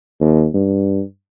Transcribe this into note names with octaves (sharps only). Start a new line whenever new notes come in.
D#2
G2